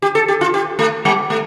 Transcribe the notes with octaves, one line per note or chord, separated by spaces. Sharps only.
G4
A4
G4
F4
G4
A3
G3
A3